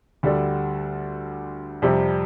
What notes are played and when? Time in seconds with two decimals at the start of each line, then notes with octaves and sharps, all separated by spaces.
0.23 D2 D3 G3 D4 A4
1.82 F2 C3 G3 D4 G4